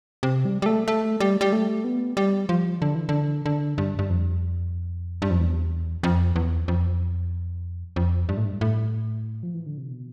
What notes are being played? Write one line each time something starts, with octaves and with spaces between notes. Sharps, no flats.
C3
G3
G3
A3
A3
G3
G3
A3
B3
G3
F3
D3
E3
D3
D3
G2
G2
F2
G2
F2
E2
F2
E2
F2
F2
G2
A2
G2
A2
F3
E3
D3
C3
B2